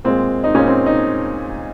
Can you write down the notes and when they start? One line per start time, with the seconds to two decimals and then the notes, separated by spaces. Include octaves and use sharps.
0.05 A#2 G#3 C4
0.44 D#4
0.54 A#2 G#3 C#4
0.67 C4
0.86 D#4